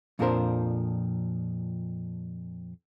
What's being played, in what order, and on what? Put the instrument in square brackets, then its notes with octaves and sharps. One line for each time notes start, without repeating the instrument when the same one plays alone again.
[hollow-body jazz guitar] F2 A#2 F3 D4 A#4 C5